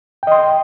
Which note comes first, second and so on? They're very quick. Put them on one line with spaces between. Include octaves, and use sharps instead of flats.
G5 D#5 C6